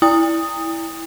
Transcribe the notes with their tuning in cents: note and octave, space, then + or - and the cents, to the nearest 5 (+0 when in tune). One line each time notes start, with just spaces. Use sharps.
E4 +0 G5 +40 D#6 +0